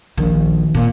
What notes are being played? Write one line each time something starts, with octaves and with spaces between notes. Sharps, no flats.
A#1 D#3
A#2